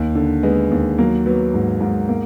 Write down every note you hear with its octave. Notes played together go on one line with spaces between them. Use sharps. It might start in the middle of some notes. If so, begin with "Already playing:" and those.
Already playing: D#2
D3
G#3 B3
D#2
F#3 A#3
F#3 B3
G#2
G#2
A#3